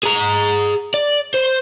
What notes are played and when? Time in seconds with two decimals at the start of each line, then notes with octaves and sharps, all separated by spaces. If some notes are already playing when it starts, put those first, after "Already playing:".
0.03 G#4 A#5
0.94 D5
1.34 C5